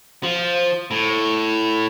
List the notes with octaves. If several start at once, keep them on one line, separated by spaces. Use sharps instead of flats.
F3
A2